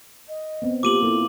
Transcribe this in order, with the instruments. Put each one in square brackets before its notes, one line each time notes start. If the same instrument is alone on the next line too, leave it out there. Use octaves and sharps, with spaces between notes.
[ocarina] D#5
[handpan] B3 C4
[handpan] A#3 F4 [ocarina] G4 [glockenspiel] D6 D#7 F#7
[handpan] A#3 E4 [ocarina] A4